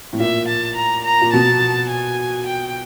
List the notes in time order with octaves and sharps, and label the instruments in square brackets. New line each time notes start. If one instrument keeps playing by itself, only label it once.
[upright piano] A2
[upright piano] A#2 [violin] E5
[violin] A5
A#5
A#5
[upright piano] A#2
[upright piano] B2 [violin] A5
[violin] G#5
G5